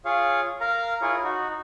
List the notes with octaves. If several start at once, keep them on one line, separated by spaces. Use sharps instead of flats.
F4 G#4 C#5 F5
A#4 F5 A#5
E4 F4 G#4 A#4 C#5
D#4 F#4